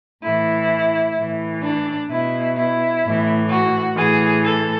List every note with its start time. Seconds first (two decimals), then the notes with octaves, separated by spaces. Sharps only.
0.23 A2 E3 E4
1.16 A2 E3
1.63 D4
2.10 B2 E4
2.57 E4
3.04 A2 E3
3.50 F#4
3.97 A2 E3 G#4
4.44 A4